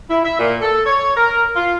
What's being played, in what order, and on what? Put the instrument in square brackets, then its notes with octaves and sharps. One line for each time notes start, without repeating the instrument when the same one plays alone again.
[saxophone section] E4
E5
A#2
A4
C#5
A#4
F4